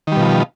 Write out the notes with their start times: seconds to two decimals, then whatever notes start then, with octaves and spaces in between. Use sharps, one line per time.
0.07 D#3
0.12 G3
0.16 B2
0.21 F3